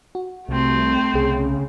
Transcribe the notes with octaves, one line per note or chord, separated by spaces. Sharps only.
F#4
C2 A3 C4
C2 C#3 G#4